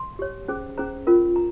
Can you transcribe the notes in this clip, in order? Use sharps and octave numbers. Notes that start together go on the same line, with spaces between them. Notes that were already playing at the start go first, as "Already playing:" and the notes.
Already playing: C6
G4 C#5
C#4 G#4 C5
C#4 G#4 C5 A#5
C#4 F4 A#4
A#5